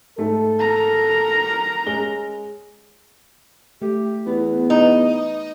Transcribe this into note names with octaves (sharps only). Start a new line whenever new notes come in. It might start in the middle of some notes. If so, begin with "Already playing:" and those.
G#2 A3 A4
A#4 A#5
G#3 C#4 G7
A3 G4
E2 B3
D#4 B4